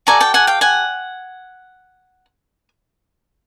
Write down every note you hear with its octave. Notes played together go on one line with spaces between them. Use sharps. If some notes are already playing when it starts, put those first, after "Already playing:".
F#4 A4 D5 G#5 A#5
G5 A5
F#5 G#5
F5 G5
F#5 G#5